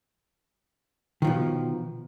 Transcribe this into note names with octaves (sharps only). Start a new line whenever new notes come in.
B2 D#3 F3